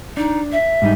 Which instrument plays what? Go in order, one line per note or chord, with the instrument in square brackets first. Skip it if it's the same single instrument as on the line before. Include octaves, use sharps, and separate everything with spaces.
[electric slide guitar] D4 [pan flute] D#4
[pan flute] E5
[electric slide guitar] G#2 G3 D#4